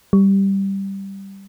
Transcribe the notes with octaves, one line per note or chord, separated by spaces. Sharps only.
G3